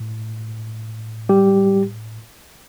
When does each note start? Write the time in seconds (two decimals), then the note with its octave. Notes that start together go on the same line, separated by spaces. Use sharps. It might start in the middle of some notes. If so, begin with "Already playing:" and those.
Already playing: A2
1.29 G3 G4